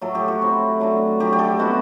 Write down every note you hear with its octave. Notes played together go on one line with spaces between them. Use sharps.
A2 F#3 A3 A4
G4
F#4
F#3 C4 E4
F#3 A3 D4
F#3 A3 D4 G4
G4
A4
B2 G3 C4 E4 F#4